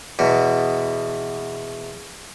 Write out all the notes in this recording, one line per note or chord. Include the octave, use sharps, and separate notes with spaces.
E2 B2